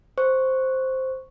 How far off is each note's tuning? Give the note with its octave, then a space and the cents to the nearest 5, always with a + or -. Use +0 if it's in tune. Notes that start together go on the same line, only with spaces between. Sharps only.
C5 +0 C#6 +0